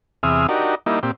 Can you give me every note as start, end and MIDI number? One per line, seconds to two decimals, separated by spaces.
0.23 0.47 40
0.23 0.47 48
0.23 0.47 68
0.23 0.47 76
0.23 0.47 87
0.23 0.47 89
0.49 0.75 62
0.49 0.75 63
0.49 0.75 66
0.49 0.75 67
0.49 0.75 70
0.86 0.99 55
0.86 0.99 58
0.86 0.99 63
0.86 0.99 64
1.03 1.11 46
1.03 1.11 60
1.03 1.11 67